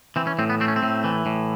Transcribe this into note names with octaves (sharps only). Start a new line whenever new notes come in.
E3 C4
C#4
A2 C4
B3
A3 C4
C#4
C4
A2
E3
A2